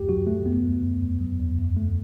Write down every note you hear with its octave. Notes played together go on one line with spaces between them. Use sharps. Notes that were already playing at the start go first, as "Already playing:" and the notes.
Already playing: F#2 A3 G4
F#3 F#4
A3
F#2 B3
A3
F#2
E2
F#3
E2
F#2
A3